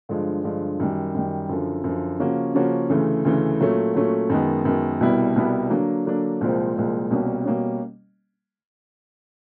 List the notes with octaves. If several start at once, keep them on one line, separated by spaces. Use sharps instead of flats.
G2 D3 F3 G#3
G2 D3 F3 G#3
F#2 D#3 G3
F#2 D#3 G3
F#2 D3 F3
F#2 D3 F3
C#3 F3 A#3 C#4 F#4
C#3 F3 A#3 C#4 F#4
D2 C#3 E3 A3
D2 C#3 E3 A3
A#2 F#3 A3 C#4
A#2 F#3 A3 C#4
F#2 D#3 G#3 B3
F#2 D#3 G#3 B3
C2 B2 G3 B3 E4
C2 B2 G3 B3 E4
D3 F#3 A#3 D4
D3 F#3 A#3 D4
C2 A#2 F3 G#3 C4
C2 A#2 F3 G#3 C4
C2 B2 G3 A#3 C#4
B2 G3 A#3 C#4